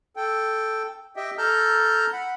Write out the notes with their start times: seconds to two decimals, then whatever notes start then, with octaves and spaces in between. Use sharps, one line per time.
0.16 A4 G5
1.16 G4 D#5 E5 G5
1.38 A4 A5 A#5 F6 G6
2.13 F#5 B5